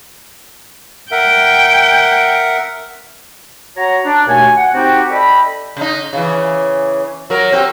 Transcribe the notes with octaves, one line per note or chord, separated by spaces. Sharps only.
A#4 E5 F#5 G5
F#4 C#5 A#5
D4
D#2 B2 A3 C#5 G#5
F#5
C4 D#4 F#4 G4
A4 D5 D#5 G5 B5
C#3 D#4
C#3 E3
F#3 A#4
C4 F#4 G4